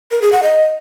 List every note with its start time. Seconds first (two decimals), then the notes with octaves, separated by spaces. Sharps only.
0.11 A#4
0.22 G#4
0.32 F#5
0.43 D#5